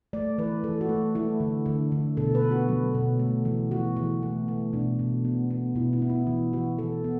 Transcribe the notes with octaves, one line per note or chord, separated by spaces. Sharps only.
A3 D5
E3 B4
E3 A4
F#4
A3
A3 E4
D3
D3
D3
B2 A4
B4
B3
F#4
F#3
B2
A3
E3
E3 F#4
E3
A3
A3
B2 D4
B2
B3
B3
B2 E4
E4
B3
E4
E3
E3 F#4
E3 A4
B3